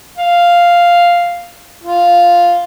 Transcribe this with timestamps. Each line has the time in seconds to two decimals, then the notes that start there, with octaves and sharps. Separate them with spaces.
0.18 F5
1.84 F4